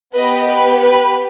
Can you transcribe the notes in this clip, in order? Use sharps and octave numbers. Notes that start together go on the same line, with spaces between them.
B3 G4 B4 D#5
B4
B4